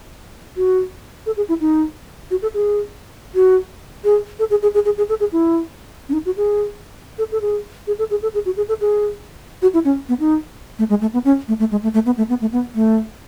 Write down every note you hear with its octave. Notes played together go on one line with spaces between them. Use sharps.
F#4
A4
G#4
E4
D#4
F#4
A4
G#4
F#4
G#4
A4
G#4
G#4
G#4
G#4
G#4
A4
G#4
E4
C#4
D#4
F#4
G#4
A4
A4
G#4
G#4
A4
G#4
A4
G#4
F#4
G#4
A4
G#4
F#4
E4
C#4
B3
D#4
A3
G#3
A3
B3
C#4
A3
A3
G#3
A3
A3
B3
A3
B3
A3
B3
A3